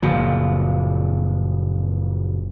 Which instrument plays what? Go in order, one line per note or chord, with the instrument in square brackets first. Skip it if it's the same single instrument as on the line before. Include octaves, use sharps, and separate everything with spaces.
[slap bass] F#1 A#2 F3